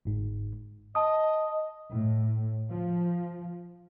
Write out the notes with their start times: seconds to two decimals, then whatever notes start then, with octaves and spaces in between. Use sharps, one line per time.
0.05 G1 G#2
0.95 D#5 A5 D#6
1.92 A2
2.71 F3